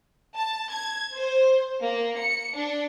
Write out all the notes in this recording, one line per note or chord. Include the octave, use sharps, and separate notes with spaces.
A5
G#6
C5
A#3
C#7
D4